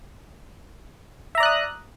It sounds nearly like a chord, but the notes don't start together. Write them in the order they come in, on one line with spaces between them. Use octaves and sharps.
E5 A#5 D5 F#6 D#6